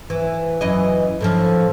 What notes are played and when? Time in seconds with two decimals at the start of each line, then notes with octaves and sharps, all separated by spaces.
0.10 E3
0.61 F#2 E3 D#5
1.20 A2 D3 F3